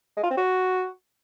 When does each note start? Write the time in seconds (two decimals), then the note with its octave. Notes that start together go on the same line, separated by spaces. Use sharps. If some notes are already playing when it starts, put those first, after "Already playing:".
0.17 G#3
0.24 F4
0.30 C4
0.37 F#4